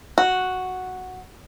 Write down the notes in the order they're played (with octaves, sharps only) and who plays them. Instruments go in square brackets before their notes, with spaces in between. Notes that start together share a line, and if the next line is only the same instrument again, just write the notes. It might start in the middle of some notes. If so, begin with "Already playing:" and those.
[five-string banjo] F#4